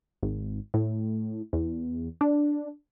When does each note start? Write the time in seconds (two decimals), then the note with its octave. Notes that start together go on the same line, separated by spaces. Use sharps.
0.23 G#1
0.74 A2
1.53 E2
2.21 D4